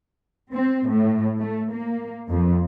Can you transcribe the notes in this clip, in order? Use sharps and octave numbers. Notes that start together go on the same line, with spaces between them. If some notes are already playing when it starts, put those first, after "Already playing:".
C4
A2
A3
A#3
F2